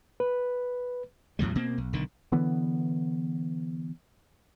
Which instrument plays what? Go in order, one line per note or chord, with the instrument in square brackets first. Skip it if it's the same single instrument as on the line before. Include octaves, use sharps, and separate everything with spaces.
[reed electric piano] B4
[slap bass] E2 A2 F#3 G3
B2 A#3 C4
B1
B1 D3 D#3
[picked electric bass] D3 E3 B3